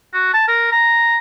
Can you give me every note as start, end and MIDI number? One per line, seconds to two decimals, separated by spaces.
0.13 0.33 66
0.34 0.45 81
0.48 0.69 70
0.71 1.19 82